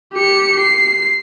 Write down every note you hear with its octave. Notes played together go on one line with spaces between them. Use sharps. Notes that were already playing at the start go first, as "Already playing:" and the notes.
G4 C#7
C7